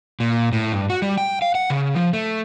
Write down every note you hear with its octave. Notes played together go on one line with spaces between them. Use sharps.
A#2
A2
G2
F#4
G3
G5
F5
F#5
C#3
F3
A3